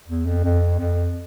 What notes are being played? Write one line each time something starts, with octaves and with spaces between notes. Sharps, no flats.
E2
F2
F2
F2